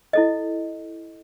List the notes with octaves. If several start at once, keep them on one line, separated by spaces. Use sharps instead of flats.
E4 A4 D#5